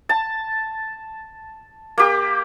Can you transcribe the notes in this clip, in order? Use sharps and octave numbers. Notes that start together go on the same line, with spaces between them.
A5
A#3 G4